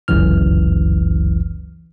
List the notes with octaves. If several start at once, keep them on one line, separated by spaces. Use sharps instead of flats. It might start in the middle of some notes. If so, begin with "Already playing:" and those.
G1 C#2 F#2 E3 F6